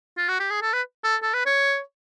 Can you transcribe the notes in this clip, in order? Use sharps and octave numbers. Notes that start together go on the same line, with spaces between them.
F4
F#4
G4
G#4
A4
B4
A4
A4
B4
C#5